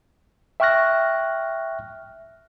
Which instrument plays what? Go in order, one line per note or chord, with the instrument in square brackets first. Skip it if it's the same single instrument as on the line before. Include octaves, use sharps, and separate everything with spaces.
[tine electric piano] E5 G5 C#6 F6 F#6 A#6